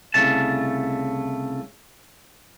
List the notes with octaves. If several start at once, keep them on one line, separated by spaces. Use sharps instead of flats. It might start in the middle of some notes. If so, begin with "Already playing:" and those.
C2 C#3 A3 A5